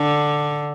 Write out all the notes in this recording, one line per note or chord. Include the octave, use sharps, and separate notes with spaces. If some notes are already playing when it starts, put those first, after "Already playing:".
Already playing: D3